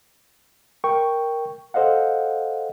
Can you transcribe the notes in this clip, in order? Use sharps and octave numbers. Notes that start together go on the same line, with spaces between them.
A#4 G5 C#6
A4 C5 D#5 F5 F#5